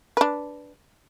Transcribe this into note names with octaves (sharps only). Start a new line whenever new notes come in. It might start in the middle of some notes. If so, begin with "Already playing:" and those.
D4 B4